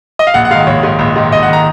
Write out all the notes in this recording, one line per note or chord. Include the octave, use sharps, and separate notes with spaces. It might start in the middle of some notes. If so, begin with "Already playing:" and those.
D#5
F5
A#1 F#5
F#5
G#2 D#3 F5
A#1 C#5
G#2 D#3
A#1
G#2 D#3
A#1 D#5
F#5
D#3 A#5